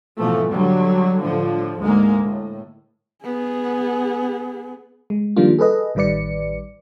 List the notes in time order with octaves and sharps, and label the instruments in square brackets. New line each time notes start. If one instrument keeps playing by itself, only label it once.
[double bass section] G#2 B2 E3 F3 A3
D3 F#3 G3
A2 D3 F3
D2 G#2 G#3 A#3
A2
[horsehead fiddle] B3 G#4
[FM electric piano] G#3
D#3 F3 G3 A#3 D4 F4
G#4 A4 B4 D#5
A1 D#3 G3 B4 D5 C#7